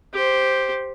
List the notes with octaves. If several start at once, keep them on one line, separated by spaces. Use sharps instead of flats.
G4 C5